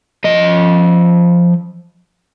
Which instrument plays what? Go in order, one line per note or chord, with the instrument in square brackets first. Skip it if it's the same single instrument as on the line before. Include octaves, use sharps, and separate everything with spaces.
[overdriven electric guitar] F3 D#5